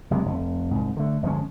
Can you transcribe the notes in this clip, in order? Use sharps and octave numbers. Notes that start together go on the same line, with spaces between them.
F#1 C3 G#3
F1
C2 G#2
D3 A3
G1 F3 G#3 C#4